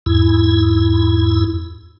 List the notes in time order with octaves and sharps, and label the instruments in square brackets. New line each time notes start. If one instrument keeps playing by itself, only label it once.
[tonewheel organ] E2 G#2 E4